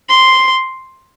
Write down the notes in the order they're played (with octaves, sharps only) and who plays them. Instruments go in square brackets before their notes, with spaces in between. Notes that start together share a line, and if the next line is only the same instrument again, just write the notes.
[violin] C6